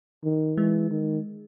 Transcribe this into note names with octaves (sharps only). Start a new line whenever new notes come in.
D#3
E3 G#3
D#3